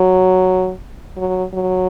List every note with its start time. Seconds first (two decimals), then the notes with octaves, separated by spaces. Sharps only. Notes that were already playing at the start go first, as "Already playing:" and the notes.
Already playing: F#3
1.17 F#3
1.54 F#3